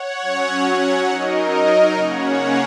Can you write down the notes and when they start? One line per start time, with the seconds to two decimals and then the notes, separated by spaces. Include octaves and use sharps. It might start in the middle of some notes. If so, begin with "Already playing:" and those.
Already playing: C#5 F#5
0.21 F#3 C#4
0.65 C#5
1.07 F#3 D#4 A#4 D#5
1.94 C#3 A#3 C#4 C#5 F#5